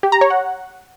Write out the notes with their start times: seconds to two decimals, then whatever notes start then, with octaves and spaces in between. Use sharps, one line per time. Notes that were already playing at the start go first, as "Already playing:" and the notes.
0.03 G4
0.12 A#5
0.21 C#5
0.30 F#5